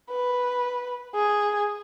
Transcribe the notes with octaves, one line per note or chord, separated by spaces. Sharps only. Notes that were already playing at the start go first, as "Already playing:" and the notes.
B4
G#4